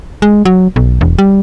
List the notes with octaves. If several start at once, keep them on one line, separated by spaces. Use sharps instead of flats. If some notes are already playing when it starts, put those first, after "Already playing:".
G#3
F#3
B1
E1
G3